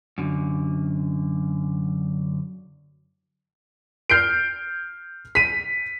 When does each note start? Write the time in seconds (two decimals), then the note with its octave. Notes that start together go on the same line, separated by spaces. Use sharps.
0.18 F#2 D3
4.10 F6 G6 C7 D7
5.35 B6 D#7